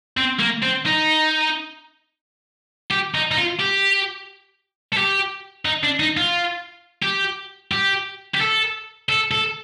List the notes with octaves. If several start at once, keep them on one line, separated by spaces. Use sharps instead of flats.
C4
A#3
C4
D#4
G4
D#4
D#4
F4
G4
A4
G4
D#4
D4
D#4
F4
G4
G4
G4
A4
A4
A4